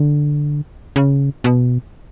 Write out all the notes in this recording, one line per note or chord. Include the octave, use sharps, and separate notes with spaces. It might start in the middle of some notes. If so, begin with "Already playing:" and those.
Already playing: D3
C#3
B2